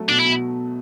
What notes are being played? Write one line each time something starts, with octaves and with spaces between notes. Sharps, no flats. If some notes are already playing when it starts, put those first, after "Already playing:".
Already playing: F#3 A3
B2 D4
E4
B2